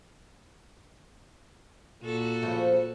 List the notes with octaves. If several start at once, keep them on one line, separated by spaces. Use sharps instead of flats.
A#2 F#4 A4
C#3 F3 A3